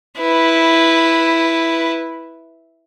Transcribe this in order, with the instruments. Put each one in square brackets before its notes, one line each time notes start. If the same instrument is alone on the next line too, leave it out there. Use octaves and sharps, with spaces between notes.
[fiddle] E4 B4